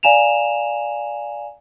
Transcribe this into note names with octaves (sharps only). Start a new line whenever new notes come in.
D5 F5 G#5 A#5 E7 F7